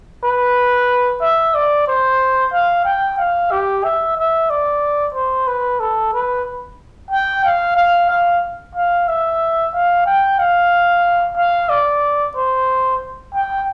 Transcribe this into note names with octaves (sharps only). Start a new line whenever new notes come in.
B4
E5
D5
C5
F5
G5
F5
G4
E5
E5
D5
C5
B4
A4
B4
G5
F5
F5
F5
F5
E5
F5
G5
F5
F5
D5
C5
G5